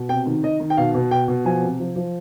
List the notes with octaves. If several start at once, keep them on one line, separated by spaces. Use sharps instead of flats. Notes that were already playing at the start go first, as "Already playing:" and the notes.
Already playing: B2
C3 G5
D#3
D#3 D#5
D#3
G5
B2 F5
B2
B2 G5
B2
F3 G#5
C3
F3
F3